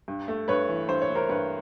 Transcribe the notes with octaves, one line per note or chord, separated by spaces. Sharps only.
G2
A3
G2 B4 C#5
E3
G2 C5
C#5
A3
A#4 C5
G2 B4 C#5